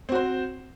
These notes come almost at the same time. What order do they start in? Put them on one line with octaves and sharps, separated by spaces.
C4 F#4 C5